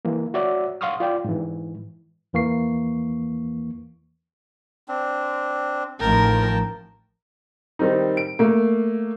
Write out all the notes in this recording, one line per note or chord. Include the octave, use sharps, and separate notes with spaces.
E3 A#3
F#4 C#5 D5 E5 F#5
F5 F#5 C6 C#6 D#6 F6
F4 D5 G5
G#2 E3
E2 E3 A#3 C#6 C7
C4 D4
A1 D#3 F3 A#4 G5 A5
D#3 G3 C4 D#4
D7
A3 A#3